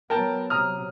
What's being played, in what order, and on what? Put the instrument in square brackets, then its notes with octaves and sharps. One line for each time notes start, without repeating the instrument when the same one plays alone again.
[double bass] F#3 B3 [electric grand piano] A#4 G5 A5
[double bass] C3 F#3 [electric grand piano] A#5 D#6 F6